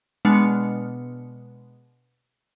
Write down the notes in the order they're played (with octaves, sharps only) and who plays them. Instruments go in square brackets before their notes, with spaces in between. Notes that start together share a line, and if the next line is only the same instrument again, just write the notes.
[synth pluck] B2 G#3 B3 D4 F6 C#7